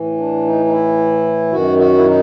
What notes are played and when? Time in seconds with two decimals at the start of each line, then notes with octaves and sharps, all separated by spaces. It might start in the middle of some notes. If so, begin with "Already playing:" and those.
Already playing: A2 E3
0.18 D4
0.45 D#4
0.65 D#4
0.71 E4
1.52 F#2 D#3 F#4
1.78 F#4
1.97 E4
2.06 D#4